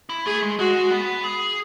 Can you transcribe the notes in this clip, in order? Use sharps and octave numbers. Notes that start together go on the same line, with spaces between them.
E4
A3 G#4
G#3
G#3 F#4
B3
G#4